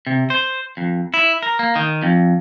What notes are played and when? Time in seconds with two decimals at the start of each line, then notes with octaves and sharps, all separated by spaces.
0.07 C3
0.30 C5
0.77 F2
1.14 E4
1.43 A#4
1.59 A#3
1.76 D#3
2.03 F2